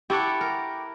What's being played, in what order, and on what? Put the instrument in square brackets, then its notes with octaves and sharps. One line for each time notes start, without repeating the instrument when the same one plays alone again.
[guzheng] E4 A4 F#5 [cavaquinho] G4 C#6 D6
[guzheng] A#4